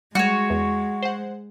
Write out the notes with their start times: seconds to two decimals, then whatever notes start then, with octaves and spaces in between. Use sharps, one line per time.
0.15 G3 G#3 F#4 C#5
0.50 E2
1.03 C5 F#5